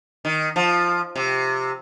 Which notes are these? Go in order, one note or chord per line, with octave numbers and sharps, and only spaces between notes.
D#3
F3
C3